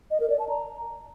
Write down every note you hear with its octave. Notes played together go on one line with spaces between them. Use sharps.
D#5
A#4
D5
A5
A#5